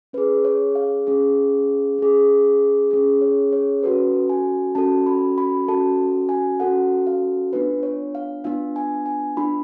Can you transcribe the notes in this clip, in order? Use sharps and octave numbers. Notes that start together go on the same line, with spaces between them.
C#4 G#4 B4
C#5
F5
C#4 G#4
C#4 G#4
C#4 G#4
C#5
C#5
C#4 F#4 A4 B4
G#5
C#4 F#4 A4 A5
B5
B5
C#4 F#4 A4 A5
G#5
C#4 F#4 A4 F#5
F5
B3 D4 F4 B4
C#5
F5
B3 D4 F4 F5
G#5
G#5
B3 D4 F4 B5